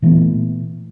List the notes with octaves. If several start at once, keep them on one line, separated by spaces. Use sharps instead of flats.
A#2 E3 A3 B3